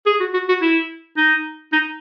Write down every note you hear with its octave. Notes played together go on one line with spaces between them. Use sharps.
G#4
F#4
F#4
F#4
E4
D#4
D#4